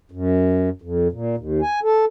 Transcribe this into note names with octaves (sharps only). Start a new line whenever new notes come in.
F#2
F2
A#2
D#2
G#5
A4